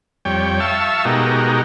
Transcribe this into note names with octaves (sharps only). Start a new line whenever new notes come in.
F2 G3 C#5 G5
E5 F5 A5 C#6 E6
B2 G#3 D#4 F#4 G4 A#4